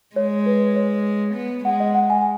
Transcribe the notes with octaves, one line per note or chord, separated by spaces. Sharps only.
G#3 C#5
B4
C#5
B3
G#3 F#5
D#5
F#5
G#5